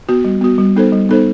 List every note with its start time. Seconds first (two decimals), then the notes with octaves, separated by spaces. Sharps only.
0.09 B3 F#4
0.25 G3
0.41 B3 F#4
0.58 G3
0.76 B3 D#4 A4 C5
0.92 G3
1.09 B3 D#4 A4 C5